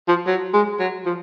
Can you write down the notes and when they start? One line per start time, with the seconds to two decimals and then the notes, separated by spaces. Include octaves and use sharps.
0.08 F3
0.27 F#3
0.54 G#3
0.79 F#3
1.06 F3